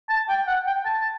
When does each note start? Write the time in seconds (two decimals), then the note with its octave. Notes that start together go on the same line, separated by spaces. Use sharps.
0.09 A5
0.29 G5
0.47 F#5
0.66 G5
0.85 A5